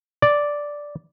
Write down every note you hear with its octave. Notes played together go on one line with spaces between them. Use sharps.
D5